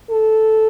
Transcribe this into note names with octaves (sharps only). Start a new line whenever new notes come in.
A4